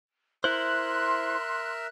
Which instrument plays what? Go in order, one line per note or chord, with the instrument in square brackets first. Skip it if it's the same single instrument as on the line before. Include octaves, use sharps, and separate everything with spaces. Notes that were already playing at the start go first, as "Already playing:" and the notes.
[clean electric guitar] E4 C5 [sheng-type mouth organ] A#4 E5 [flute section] C6 [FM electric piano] F#6